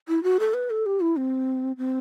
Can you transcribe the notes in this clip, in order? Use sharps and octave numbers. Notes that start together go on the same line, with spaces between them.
E4
F#4
A4
B4
A4
G4
E4
C4
C4